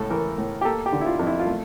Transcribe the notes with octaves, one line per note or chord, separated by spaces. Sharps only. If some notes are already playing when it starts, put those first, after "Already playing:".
Already playing: C#2 A2 A4
E3 A#4
A2
G4
A#3 A4
G4
D3
E4
F4
F2
E4
F4
A3